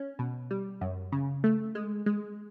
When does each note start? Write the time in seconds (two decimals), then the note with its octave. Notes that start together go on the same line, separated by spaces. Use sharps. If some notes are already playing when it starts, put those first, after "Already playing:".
Already playing: C#4
0.19 B2
0.51 G3
0.81 F#2
1.12 C#3
1.44 A3
1.75 G#3
2.06 G#3